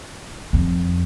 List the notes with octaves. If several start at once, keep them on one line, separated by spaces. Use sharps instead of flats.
F2